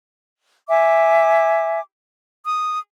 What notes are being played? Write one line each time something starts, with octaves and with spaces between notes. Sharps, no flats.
E5 G#5 D6
D#6